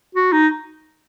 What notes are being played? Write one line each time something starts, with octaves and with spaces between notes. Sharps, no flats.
F#4
D#4